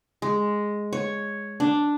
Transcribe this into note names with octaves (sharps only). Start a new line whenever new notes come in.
G#3
C#5
D4